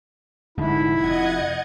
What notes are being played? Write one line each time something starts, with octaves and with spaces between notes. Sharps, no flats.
F1 G#2 D3 E4
F1 D#5 F#5 G#6